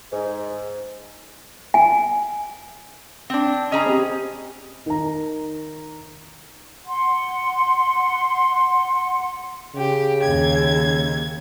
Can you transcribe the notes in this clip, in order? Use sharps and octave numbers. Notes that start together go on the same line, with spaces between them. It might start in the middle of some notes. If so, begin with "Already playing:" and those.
G#2
G#5
C4 D4
C#4 G#4 D#5 A#5
C4 G4
D#3 A#5
F#5 C6
C#3 G4
D#2 G#6